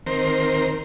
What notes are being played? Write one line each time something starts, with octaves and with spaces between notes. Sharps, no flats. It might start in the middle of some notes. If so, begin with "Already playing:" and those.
D#3 C4 A#4 C5